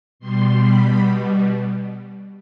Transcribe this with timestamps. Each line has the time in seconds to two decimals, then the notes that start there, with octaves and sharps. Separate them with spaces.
0.20 B2 G3 C6
0.59 B5